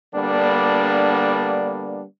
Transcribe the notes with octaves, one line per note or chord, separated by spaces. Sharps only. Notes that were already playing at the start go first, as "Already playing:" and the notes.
D3 G3 A#3 B3 D4